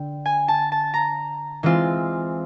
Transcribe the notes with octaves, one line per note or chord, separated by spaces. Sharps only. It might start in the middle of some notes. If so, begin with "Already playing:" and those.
Already playing: D3 G5
G#5
A5
A5
A#5
E3 G#3 C4 F4